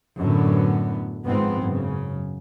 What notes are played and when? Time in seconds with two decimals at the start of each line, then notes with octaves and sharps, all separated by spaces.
0.18 F#2 A2 D3 B3
1.26 G#1 G#2 F3 B3 C4
1.62 F#2 C#3